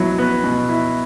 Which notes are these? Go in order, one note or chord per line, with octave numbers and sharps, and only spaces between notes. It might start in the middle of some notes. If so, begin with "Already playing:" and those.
Already playing: B2 F#3 E4
B3
B2
E4